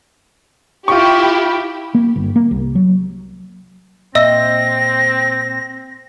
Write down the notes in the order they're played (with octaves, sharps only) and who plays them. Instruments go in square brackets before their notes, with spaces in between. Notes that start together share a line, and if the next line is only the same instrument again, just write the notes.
[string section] E4 G4 [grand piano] F4 C#6
[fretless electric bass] A#3
G1
A#3
C2
F#3
[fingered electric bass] A#2 [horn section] C4 [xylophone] D#5 E5 E6 [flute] A#6